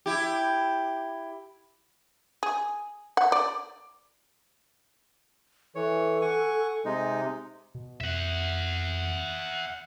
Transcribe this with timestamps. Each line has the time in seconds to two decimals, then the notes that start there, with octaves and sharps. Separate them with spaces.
0.06 E4 G4
2.43 G#4
3.17 F#5
3.32 D5
5.75 E3 A4 C#5
6.21 F#5 G#5 C#6
6.85 C3 G#3 D#4
7.75 B2
8.01 F2 E5 F#5